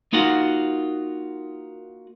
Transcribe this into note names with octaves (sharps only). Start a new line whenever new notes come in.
A#3 D#4 F4 F#4 F#5